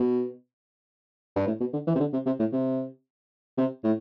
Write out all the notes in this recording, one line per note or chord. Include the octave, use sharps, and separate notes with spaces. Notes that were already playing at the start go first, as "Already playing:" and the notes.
Already playing: B2
G2
A2
B2
D3
E3
C3
D3
C3
C3
A2
C3
C3
A2